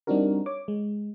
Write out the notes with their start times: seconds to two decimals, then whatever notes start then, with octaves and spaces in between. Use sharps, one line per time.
0.07 G3 C4 D4 D#4 F#4 A#4
0.46 C#5 D6
0.68 G#3